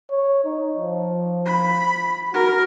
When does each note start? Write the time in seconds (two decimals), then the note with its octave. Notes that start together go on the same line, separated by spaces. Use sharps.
0.11 C#5
0.45 D#4
0.77 F3
1.46 B5
2.34 F#4 A#4